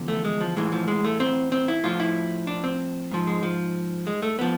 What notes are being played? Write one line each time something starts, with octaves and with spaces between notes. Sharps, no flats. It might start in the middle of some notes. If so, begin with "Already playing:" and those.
Already playing: E2 D3 F3
A3
G#3
F3
A2 E3 G#3
F3
G#3
A3
C4
C4
E4
A2 F3 F4
E4
D4
C4
G#2 F3
G#3
F3
G#3
A3
F3 B3